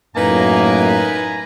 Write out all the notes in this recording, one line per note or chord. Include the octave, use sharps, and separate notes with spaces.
F#2 A2 A#3 D#4 B4 G#5 A#5